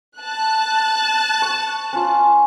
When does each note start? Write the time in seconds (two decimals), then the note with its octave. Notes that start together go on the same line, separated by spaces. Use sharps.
0.19 A5 F#6
1.42 C#6
1.93 C#4 F4